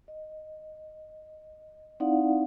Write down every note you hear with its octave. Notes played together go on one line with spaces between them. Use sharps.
D#5
C4 D#4 E4 D5 F5 F#5